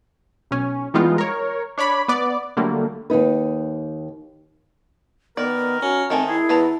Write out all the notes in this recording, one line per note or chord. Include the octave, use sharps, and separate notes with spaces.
B1 C#4
E3 G3 G#3 B3 D#4 F4
A#4 C#5
D4 C#5 D5 B5
B3 D5
D3 F#3 G3 A3 A#3
D#2 G#2 D#4 B4
D#3 B3 A#4 D5
C#4 F#4
D#3 G#3 A3 C4 A4
E4 G#4
E2 B4 A5 A#5